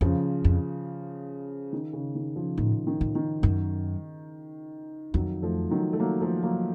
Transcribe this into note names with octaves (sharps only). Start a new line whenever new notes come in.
F2 C#3 F3
F2
D#3
C#3
D#3
C#3 F3
A2 D#3
D#3
A2
D#3
F#2
F2 D#3 F#3
F3 A3
D#3 F#3
A3
F#3 A#3
F3 A3
F#3 A#3